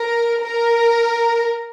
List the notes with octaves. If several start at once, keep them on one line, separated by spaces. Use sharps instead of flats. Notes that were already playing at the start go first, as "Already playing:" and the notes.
Already playing: A#4
A#4